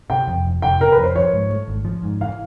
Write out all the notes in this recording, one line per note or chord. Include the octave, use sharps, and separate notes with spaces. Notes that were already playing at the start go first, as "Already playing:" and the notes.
C3 G5
F2
F1
F1 G5
C3 A#4
B4
F2
C5
F3 C#5
G#2
A3
G#1
F3
G#2
E3 F5